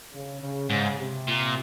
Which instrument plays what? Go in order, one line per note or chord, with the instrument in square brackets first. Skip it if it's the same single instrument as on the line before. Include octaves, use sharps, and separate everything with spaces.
[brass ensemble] C#3
C#3
[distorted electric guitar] G#2 [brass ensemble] C#3
[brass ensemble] C3
[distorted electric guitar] A#2